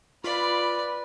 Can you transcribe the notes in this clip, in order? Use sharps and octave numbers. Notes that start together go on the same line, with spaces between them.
F4 B4 D5 B5